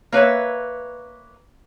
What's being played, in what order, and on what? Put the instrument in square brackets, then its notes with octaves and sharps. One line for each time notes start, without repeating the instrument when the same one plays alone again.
[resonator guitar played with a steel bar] A#3 B4 C#5 E5